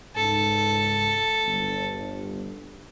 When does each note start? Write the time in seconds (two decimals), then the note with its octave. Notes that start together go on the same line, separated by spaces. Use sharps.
0.16 C#2 G#2 A4
1.46 G1